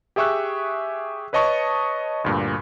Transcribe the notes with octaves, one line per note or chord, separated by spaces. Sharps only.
G4 G#4 E5 C#6 E6 F#6
B4 C#5 D#5 A5 C#6 D#6
D2 G2 A#2